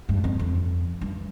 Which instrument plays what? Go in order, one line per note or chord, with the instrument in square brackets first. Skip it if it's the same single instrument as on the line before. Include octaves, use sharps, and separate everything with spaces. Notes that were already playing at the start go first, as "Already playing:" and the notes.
[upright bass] G2
F2
F2
G2